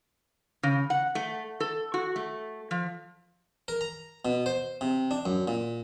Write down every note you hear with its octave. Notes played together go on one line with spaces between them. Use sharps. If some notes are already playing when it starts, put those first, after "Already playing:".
C#3
F#5
A3
A4
F#4
A3
F3
A#4
A#5
B2
C5
C3
D4
F#2
A#2